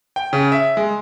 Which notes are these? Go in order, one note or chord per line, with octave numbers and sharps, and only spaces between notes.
G5
C#3
E5
G#3